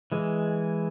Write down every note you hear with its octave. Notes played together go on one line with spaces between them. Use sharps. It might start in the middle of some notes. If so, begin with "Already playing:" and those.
E3 G#3